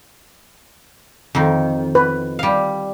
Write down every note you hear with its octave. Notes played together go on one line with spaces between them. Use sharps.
F2 D#3
B4
G3 F5